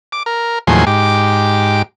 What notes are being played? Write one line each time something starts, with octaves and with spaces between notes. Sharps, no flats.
D6
A#4
D#2 A2 F3 F#3 G#4 C6
G#2 G4 D6